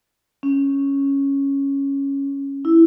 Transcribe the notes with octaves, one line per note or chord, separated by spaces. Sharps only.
C#4
E4